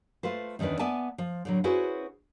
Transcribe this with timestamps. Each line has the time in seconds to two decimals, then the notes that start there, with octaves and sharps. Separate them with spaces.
0.23 A3 F4 B4 C5
0.59 E2 D#3 C#4 D4 B4
0.79 B3 D5 E5 G#5 A5
1.18 F3
1.45 A2 D3 F#3
1.64 C#4 E4 F#4 G#4 B4 C5